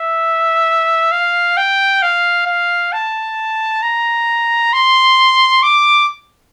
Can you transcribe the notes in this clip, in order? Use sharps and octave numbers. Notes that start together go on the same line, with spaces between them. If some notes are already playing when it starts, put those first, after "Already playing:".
Already playing: E5
F5
G5
F5
F5
A5
A#5
C6
D6